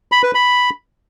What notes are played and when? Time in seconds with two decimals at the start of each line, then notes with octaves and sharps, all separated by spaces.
0.12 B5
0.23 B4
0.35 B5